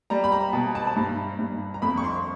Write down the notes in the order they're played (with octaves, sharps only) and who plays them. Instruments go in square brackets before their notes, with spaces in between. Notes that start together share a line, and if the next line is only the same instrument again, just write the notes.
[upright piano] G3 A#5
B5
A#5
B2 A5
A5
A5
G2 A#5
G2
A#5
F2 B5
C#6
C6